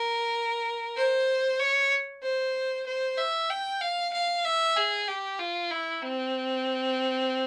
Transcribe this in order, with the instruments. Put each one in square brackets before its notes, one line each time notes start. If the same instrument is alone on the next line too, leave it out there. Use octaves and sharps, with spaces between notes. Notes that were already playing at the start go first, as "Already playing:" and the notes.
Already playing: [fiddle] A#4
C5
C#5
C5
C5
E5
G5
F5
F5
E5
G#4
G4
F4
E4
C4